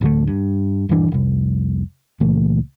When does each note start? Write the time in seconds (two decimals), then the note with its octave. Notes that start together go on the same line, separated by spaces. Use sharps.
0.01 A1 D2 D3 A3
0.27 G2
0.89 D#1 G2 E3 D4
1.12 F1 C2
2.20 C#2 A#2 E3 A3